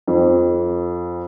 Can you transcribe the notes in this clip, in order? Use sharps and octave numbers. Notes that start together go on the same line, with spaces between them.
F2